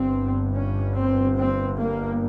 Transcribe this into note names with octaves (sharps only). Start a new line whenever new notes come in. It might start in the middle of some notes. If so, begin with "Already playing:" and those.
Already playing: G1 G2 C4
C#4
C4
C4
A#3